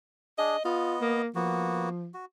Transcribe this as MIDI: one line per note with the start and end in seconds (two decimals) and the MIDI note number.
0.38 0.56 62
0.38 0.56 68
0.38 0.61 75
0.65 1.22 59
0.65 0.96 65
0.65 1.22 75
1.01 1.28 58
1.35 2.09 53
1.35 1.89 58
1.35 1.89 59
1.35 1.89 66
2.14 2.25 66